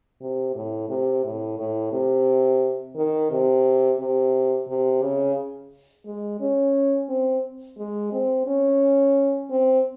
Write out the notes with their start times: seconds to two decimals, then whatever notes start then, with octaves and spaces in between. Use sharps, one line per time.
0.21 C3
0.55 A2
0.89 C3
1.25 A2
1.58 A2
1.92 C3
2.96 D#3
3.31 C3
4.00 C3
4.68 C3
5.02 C#3
6.06 G#3
6.41 C#4
7.09 C4
7.78 G#3
8.12 C4
8.47 C#4
9.50 C4